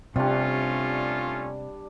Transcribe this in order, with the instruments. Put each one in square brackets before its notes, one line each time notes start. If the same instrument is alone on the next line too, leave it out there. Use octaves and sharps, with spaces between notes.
[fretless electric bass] C3 [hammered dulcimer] G3 D4 [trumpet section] A3 C#4 F4